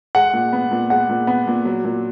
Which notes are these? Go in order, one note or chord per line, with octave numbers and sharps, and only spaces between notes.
G#3 F#5
A#2
B3
A#2
G#3 F#5
A#2
B3
A#2
F#3
A#2